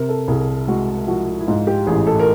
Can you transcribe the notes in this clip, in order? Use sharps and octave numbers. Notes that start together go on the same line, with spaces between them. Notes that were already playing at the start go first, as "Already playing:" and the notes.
Already playing: C3 A#4
A4
C2 G#4
G#3 F#4
F3 F#4
E4
G#2 F4
G4
A1 G#4
A4
A#4